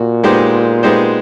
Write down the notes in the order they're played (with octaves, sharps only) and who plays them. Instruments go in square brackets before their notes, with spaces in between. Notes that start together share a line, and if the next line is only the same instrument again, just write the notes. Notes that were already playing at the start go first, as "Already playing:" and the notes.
Already playing: [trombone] A#2 [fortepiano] F#4
[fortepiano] G#3 B3 D#4 G4 C5
G#3 B3 D#4 G4 C5